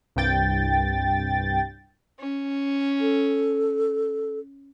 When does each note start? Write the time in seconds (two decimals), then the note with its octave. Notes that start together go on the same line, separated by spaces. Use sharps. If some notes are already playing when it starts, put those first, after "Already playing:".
0.16 C2 G2 G5 A6
2.19 C#4
3.01 A4